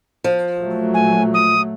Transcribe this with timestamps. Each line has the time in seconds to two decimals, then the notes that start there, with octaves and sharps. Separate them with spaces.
0.24 F3
0.59 A#2 F#3 A3
0.94 G#5
1.34 D#6